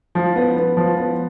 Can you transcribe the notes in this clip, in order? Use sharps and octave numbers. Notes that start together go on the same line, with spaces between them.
F3
B3
B3
F3
B3